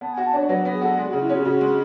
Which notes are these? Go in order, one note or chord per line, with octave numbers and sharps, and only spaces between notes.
B3 A5
G#5
F#4
A5
D4 C#5
F#3 B4
B4
B3
G#4
F#4 A4
G#3 G#4
F#4
C#3
E4
C#4 F#4
G#4
C#3 F#4
G#3